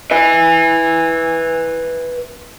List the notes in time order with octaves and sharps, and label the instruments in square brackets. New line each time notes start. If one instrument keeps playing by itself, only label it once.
[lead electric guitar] B4 E5